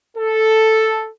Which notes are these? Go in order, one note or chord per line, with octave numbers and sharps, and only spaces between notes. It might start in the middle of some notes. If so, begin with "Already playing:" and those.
A4